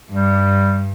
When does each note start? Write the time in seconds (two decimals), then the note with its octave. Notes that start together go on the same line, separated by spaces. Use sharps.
0.11 G2 G3